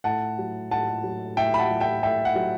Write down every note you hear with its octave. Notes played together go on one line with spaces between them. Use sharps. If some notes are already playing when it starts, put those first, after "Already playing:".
A2 F#5 A5
F#3
A2 F#5 A5
F#3
A2 E5 G5
B5
F#5 A5
F#3
E5 G5
A2 E5 G5
F#5
F#3